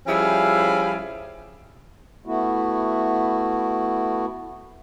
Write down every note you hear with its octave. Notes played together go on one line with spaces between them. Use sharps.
F3 G3 C#4 E4 G#4 F5
A3 B3 E4 F#4